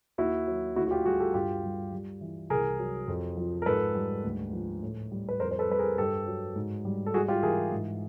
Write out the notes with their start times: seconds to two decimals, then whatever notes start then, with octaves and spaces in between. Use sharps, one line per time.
0.18 D#2 E4 F#4
0.47 F#3
0.76 D2 E4 F#4
0.87 F#4
0.91 F4 G4
1.05 G3 F#4 G#4
1.20 G4 A4
1.34 G2 F4 G4
1.63 G3
1.93 G3
2.21 E3
2.50 C2 G#4 A#4
2.79 F#3
3.08 F2
3.37 F3
3.62 A#4
3.66 G#2 A4 B4
3.95 G3
4.24 D2
4.53 F3
4.82 A2
5.11 G3
5.29 B4
5.40 F2 A#4 C5
5.51 C5
5.59 A4 B4
5.69 G3 B4
5.79 G#4 A#4
5.98 G2 G4 A4
6.27 F#3
6.56 G#2
6.85 G3
7.06 A4
7.14 G3 F#4 G#4
7.28 F4 G4
7.43 E3 G#4 A#4
7.72 G#2